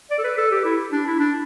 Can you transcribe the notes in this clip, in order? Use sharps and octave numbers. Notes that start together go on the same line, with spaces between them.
D5
A4
B4
A4
G4
E4
D4
E4
D4